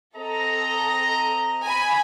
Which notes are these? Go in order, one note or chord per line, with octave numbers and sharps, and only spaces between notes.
C4 A4 D#5 A#5
G#5 B5